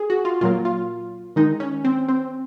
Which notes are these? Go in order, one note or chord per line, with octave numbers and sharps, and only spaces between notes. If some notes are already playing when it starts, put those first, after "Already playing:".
Already playing: G#4
F#4
F4
A#2 F#3 A#3 F4
F4
D#3 G#3 D#4
C#4
C4
C4